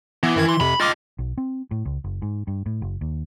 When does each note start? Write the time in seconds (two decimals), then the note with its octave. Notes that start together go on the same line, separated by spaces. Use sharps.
0.23 E3 B3
0.36 F#2 D#3 G#6
0.49 C6
0.60 F2 C3 B5
0.80 F4 D#5 D6 F6 A6
1.19 B1
1.38 C4
1.71 A2
1.85 C#2
2.04 F#1
2.22 G#2
2.47 G2
2.66 A2
2.82 F#1
3.01 D#2